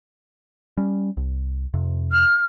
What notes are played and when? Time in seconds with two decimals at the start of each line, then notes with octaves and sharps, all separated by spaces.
0.77 G3 C#4
1.17 C2
1.74 F2 C3
2.12 F6